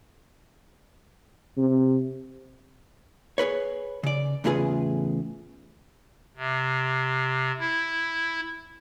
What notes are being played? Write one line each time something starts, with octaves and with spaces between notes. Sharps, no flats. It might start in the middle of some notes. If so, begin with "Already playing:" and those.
C3
G#4 A#4 B4 C#5
C#3 D5
E2 A2 C#3 F4 G#4 B4
C3
E4